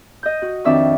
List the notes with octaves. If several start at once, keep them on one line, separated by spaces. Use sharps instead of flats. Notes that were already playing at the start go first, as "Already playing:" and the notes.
D#5 G6
F#4
F2 D#3 D4 E5 C#6 D6